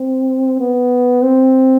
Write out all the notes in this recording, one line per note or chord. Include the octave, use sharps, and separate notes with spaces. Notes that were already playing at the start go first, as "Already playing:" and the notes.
Already playing: C4
B3
C4